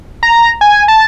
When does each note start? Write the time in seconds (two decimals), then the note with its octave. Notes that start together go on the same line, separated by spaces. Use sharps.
0.23 A#5
0.61 G#5
0.88 A5